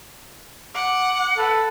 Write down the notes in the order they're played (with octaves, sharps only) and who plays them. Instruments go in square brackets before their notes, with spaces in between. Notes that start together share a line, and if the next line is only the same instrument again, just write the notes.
[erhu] F#5 [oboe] D6
[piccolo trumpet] A4 [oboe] B4